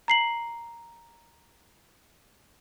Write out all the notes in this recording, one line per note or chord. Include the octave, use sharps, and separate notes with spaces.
A#5 C7 F#7